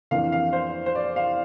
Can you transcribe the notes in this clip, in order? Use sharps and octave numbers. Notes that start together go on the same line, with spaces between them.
F2 E3 A#3 D4 F5
F5
C5
C5
D5
F5